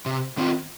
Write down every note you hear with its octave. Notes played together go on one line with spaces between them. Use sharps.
C3
D#3 C4 F4